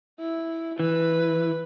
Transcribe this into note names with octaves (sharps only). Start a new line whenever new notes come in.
E4
E3 B4